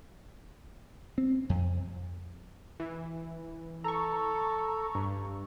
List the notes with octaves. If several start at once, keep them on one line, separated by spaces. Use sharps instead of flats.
C4
F2
E3
A4 A#5 C#6
G2